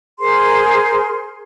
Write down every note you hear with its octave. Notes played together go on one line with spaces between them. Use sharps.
G#4 A#4 C5 C6